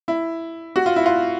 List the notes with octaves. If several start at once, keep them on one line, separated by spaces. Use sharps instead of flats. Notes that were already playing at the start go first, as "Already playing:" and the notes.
E4
F#4
F4
E4
F4